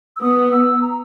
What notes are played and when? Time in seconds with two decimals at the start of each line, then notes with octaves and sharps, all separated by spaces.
0.16 E6
0.21 B3 D#6
0.52 E6
0.82 A#5